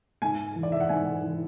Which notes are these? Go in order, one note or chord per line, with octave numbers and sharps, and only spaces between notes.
G#2 G#5
E3
D5
E5
F#5
G#2 G#5
E3